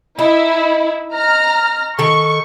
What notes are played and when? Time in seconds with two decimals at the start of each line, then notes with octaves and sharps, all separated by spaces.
0.19 D#4 E4
1.13 A#5 F6
1.99 D#3 A4 C#6